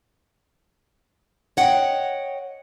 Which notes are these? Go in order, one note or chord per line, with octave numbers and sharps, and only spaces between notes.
C#5 D#5 F#5 G5